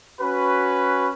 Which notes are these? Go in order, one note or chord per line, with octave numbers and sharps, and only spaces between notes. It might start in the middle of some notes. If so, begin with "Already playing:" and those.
C#4 F#4 B4